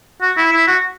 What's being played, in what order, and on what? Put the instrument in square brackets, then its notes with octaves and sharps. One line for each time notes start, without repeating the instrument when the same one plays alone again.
[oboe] F#4
E4
E4
F#4